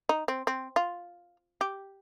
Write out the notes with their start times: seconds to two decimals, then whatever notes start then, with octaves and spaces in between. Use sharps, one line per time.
0.09 D#4
0.28 C4
0.47 C4
0.76 F4
1.61 G4